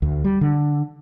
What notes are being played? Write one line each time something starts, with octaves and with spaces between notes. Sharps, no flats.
D2
G3
D3